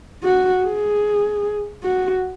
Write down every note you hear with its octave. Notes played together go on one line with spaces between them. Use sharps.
F#4
G#4
F#4